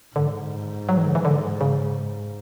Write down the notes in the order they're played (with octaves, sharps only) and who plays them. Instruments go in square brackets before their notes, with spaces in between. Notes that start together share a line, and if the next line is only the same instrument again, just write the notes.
[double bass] G#2 [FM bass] D3
[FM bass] F#3
E3
D3
E3
D3
C#3